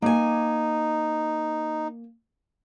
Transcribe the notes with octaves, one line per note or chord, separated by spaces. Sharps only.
A#3 D#4 G#5